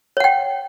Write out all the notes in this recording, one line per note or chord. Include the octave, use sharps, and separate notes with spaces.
C#5 F#5 G5